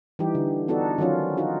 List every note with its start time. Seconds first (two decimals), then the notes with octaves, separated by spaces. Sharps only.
0.19 E3 G3 D#4 G4
0.35 D3
0.68 B3 D4 D#4 F#4 A4
0.98 D#3 F3 F#3 C#4 F4
1.37 D#4 F4 F#4